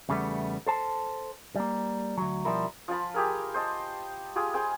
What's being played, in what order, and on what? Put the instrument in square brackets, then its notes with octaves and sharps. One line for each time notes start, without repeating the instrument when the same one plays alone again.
[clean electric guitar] E2 C#3 G3 A3 B3
A4 C5 A5
G3 A#3
D2 F#3
B2 F3 G3 E4 A#4
[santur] F3 F4 A5 B5
G4 G#4 A#4
C5 D#5 A5
F4 G4 G#4 B5
G#4 C5 G5 G#5